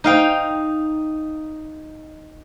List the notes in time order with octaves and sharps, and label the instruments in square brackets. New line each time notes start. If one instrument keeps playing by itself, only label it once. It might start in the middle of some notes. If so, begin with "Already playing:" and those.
[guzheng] D#4 F5 G5